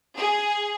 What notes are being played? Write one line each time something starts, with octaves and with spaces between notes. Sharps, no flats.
G#4